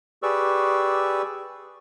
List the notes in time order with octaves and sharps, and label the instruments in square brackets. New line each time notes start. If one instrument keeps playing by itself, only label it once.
[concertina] G4 G#4 B4 D5 C#6 E6